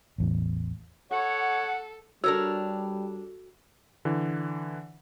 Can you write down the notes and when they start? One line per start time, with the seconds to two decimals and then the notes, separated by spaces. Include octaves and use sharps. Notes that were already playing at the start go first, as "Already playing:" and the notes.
0.18 A1 E2 A2
1.11 A4 C#5 F#5
2.24 G3 D4 F#4 A4 A#4 C#5 E6
4.05 D3 E3